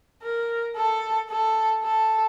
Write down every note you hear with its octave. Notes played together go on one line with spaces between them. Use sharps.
A#4
A4
A4
A4